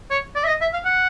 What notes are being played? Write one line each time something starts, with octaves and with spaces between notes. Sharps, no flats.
C#5
D5
E5
D#5
E5
F5
F#5